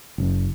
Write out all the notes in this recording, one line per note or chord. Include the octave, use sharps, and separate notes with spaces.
F#1